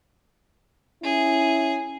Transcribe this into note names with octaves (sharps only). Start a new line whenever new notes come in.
C#4 E4 G#4